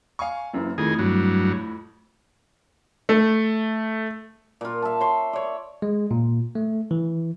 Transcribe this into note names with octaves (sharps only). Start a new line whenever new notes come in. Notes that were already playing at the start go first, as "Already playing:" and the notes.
F5 G#5 C#6
F#1 F#2 E3
F2 A2 D#3 G#4
G2 F#3
A3
A#2 F4
E5 A5
C#5 C6
C#5 D5
G#3
A#2
A3
E3